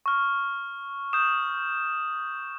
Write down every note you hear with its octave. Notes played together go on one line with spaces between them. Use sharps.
C#6 F6
D#6 G6 E7